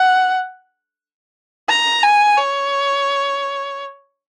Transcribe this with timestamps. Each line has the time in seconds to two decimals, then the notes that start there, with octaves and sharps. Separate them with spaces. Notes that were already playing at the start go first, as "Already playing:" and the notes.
Already playing: F#5
1.69 A#5
2.03 G#5
2.38 C#5